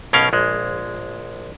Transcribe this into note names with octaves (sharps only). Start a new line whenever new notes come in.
B1 B2 C#4 A#4 F5
A#1 G#3